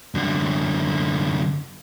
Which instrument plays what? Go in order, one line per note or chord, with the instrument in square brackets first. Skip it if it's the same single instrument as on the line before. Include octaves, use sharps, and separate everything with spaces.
[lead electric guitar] F#2 D3